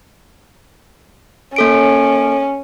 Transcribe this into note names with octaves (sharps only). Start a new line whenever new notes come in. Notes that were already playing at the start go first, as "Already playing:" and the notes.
A#3 C#4 A4 D7